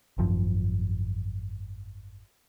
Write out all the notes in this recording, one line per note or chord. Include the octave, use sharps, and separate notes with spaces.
G#1 F#2 F3